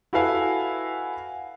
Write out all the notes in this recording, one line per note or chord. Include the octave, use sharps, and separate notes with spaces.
E4 F#4 A4 B4 F5 G#5